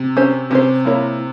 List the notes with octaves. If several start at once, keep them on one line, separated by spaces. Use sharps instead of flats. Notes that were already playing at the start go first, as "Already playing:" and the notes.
Already playing: C3
C#4 G4 C5
C3 C#4 G4 C5
A#3 E4 A#4 C#5